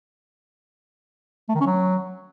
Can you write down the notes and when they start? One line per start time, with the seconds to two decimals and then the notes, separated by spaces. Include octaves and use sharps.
1.49 A3
1.55 D#3
1.60 C#4
1.66 F#3